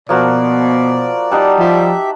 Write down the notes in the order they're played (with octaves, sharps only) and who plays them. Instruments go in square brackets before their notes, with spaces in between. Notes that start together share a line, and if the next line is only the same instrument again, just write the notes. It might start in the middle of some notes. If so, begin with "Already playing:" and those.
[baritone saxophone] B2 [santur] F3 A#3 F#4 [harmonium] D5
[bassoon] G3 [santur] D#4 F#5 A5
[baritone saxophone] F3 [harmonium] G4 E5